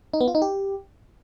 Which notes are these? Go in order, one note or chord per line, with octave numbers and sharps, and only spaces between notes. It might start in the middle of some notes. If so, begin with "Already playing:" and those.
D#4
B3
F4
D#4
G4